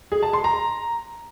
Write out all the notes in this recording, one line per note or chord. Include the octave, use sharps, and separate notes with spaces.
G#4
A5
C6
A#5